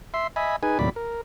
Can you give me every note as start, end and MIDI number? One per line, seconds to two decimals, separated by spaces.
0.14 0.27 76
0.14 0.27 84
0.36 0.56 75
0.36 0.56 76
0.36 0.56 80
0.36 0.56 83
0.63 0.78 63
0.63 0.78 68
0.63 0.78 71
0.63 0.78 80
0.79 0.90 39
0.79 0.90 45
0.79 0.90 48
0.79 0.90 54
0.79 0.90 74
0.79 0.90 83
0.96 1.21 70